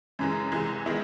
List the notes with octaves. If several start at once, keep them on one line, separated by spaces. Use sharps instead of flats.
F#2 C#3 E3 G#3
C2 C3 E3 G#3
D#3 G#3 B3 E4